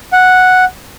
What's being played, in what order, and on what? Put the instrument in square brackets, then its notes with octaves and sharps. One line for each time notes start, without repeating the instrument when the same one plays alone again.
[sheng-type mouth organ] F#5